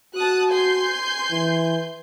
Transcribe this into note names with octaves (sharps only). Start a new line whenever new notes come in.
F#4 A5 D#6 F#6
G#5 C6 G6
E3